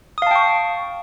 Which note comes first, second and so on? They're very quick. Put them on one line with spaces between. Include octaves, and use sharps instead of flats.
D#6 F5 A5 G5 C#6